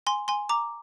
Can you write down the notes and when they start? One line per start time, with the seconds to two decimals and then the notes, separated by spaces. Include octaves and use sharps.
0.07 G#5 C6
0.28 G#5 C6
0.49 A#5 D6